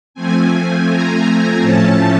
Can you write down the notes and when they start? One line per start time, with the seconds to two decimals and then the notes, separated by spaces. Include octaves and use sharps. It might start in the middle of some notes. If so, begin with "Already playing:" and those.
0.14 F3 A3 C4 G#5
0.51 G#5
0.88 A#5
1.61 A2 F3 A3 C#4 A5